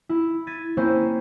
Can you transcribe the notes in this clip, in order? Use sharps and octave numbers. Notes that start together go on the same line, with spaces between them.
E4
G#6 A6 B6 D#7
A#3 C4 C#4 E4 C5